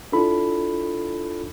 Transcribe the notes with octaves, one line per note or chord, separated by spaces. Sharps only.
D4 E4 F4 A4 B5